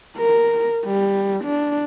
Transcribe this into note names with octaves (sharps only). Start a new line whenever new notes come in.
A#4
G3
D4